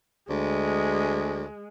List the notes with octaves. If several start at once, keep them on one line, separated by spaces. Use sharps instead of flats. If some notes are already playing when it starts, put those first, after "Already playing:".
D2 G#3